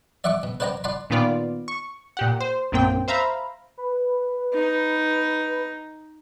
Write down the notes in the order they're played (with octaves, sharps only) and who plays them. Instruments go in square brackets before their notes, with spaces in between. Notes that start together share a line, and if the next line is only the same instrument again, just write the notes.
[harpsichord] D5 E5 F#5 C#6 D6
B2
B4 C5 D5 F#5 G5 A#5
D5 F#5 A5 B5 C6
[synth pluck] A#2 D#3 B3 F4 D5
C#6
A#2 G4 F#5
C5
A#1 F#2 A#3 C4 G5
C5 E5 F5 A#5 B5
[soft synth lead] B4
[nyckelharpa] D#4